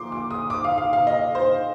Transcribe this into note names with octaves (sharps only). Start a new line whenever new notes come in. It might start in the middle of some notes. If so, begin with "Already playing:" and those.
Already playing: A#2 F3 C6 D6
D6
D#6
D6
F5
F5
F5
D#5
C5